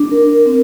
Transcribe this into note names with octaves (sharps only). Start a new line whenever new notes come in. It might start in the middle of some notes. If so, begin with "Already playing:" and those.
Already playing: D4
A#4
C4